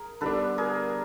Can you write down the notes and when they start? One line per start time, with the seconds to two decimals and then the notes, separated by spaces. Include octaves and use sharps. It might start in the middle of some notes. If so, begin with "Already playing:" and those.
Already playing: G#4 A#4
0.21 D3 G3 B3 D4 A4 B4
0.58 G#4 A#4